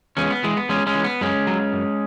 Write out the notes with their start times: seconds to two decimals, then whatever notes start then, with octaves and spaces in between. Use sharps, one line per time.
0.17 E2 G#3 C#4
0.31 B3
0.43 E3 G#3
0.57 B3
0.69 E2 G#3 C#4
0.87 G#3 C#4
0.95 E3
1.04 B3
1.21 F#2 G#3 C#4
1.47 F#3
1.73 F#2